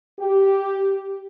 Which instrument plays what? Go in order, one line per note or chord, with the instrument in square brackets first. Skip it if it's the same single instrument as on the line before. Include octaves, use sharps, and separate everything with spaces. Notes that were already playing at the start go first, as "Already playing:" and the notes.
[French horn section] G4